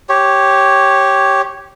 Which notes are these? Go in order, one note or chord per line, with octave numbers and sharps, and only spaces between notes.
G4 C#5